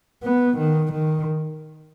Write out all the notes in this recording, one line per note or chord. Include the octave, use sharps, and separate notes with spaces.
B3
D#3
D#3